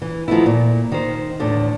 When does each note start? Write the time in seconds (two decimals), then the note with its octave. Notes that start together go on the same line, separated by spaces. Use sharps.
0.02 E3
0.28 D#3 F3 A3 B3 E4
0.46 A#2
0.92 D#3 C5
1.40 E2 A2 D3 D4